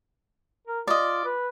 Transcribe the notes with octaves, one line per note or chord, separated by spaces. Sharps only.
A#4
F4 D5 D#5
B4